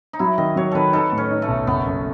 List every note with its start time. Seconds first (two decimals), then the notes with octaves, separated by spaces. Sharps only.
0.13 D#4
0.19 F#3 E4
0.38 D#3 D#5
0.56 F#3 C#5
0.71 D#3 A4 B4
0.93 D#4 A4
1.12 A2
1.18 C#4
1.31 D#4
1.42 A3
1.48 B1
1.67 F#1 B3
1.86 F#2